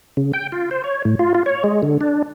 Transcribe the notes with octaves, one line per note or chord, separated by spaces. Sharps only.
C#3
G5
F4
C5
C#5
A2
F4
F4
C#5
G#3
D3
D4